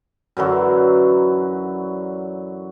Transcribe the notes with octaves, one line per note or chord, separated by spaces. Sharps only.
F#2 D3 E3 F#3